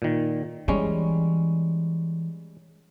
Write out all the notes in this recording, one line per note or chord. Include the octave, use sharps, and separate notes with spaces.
A#2 D#3
E3 G3 G#3 C#4